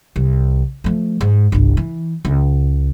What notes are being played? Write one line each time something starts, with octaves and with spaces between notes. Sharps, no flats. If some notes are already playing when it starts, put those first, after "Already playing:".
C2
F3 A3
G#2
G1 C2
E3
C#2